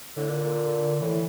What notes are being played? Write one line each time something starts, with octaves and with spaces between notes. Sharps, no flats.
A2 D3
A#2
A#2
A2 E3